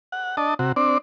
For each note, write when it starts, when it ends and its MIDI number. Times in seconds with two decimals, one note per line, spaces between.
0.12 0.36 78
0.37 0.54 62
0.37 0.54 75
0.37 0.54 81
0.59 0.72 48
0.59 0.72 66
0.76 0.98 60
0.76 0.98 62
0.76 0.98 74